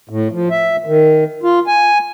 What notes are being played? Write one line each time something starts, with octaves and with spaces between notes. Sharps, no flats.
A2
F3
E5
D#3
F4
G#5